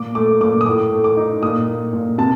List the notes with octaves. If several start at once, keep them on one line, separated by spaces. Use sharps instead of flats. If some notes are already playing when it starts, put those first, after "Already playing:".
Already playing: A#2 D6
A3 D6
A#2 D6
D#6
A2 D6
A3
D6
D#4
A#2 D#6
A#2
A#2
C3 A5